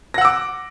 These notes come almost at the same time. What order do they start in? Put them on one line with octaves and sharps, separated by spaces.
A#6 F#5 E6 D6